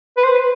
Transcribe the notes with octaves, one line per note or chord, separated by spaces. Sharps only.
B4
C5
B4